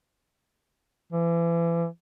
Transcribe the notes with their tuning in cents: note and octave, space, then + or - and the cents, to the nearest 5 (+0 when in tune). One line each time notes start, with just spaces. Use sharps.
E3 +35